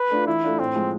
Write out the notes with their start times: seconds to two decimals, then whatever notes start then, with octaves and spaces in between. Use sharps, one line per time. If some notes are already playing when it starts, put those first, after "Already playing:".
Already playing: B4
0.10 A3 D4 F4
0.26 E3 E4
0.44 A3 D4 F4
0.59 A2 C4
0.76 F3 G#3